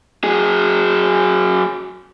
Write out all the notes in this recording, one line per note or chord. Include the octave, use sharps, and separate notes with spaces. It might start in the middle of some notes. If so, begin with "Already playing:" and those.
F#3 G#4